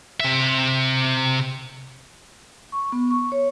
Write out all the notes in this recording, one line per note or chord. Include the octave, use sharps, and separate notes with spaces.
C3 E5
C#6
B3
C#6
C#5